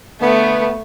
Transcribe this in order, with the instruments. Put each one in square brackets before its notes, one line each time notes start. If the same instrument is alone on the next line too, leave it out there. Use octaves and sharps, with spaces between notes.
[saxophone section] D3 B3 [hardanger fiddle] A3